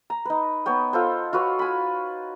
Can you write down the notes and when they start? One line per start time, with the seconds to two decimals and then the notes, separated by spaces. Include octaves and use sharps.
0.10 A#5
0.25 D#4 B4
0.66 B3 C#5 G5
0.93 F4 A4 C5
1.33 F4 F#4 B4 C#5
1.59 G#5 B5